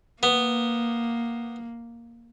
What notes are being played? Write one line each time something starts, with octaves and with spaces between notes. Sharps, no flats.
A#3 B3